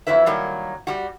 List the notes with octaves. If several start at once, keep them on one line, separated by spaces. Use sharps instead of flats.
F2 F#3 E4 B4 E5
D#3 F#3 G3 A#3
G3 F#4